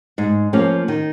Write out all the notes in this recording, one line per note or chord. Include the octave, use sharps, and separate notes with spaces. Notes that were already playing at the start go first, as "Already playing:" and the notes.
G#2
F3 A#3 C#4
D#3